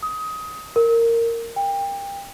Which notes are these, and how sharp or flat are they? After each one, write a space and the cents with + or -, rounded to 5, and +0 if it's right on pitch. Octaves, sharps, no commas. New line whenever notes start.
D#6 +20
A#4 -15
G5 +25